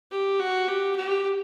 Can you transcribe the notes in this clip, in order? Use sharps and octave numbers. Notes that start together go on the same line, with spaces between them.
G4
F#4
G4
G4